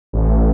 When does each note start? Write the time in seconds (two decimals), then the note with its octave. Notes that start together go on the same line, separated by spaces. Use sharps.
0.13 A1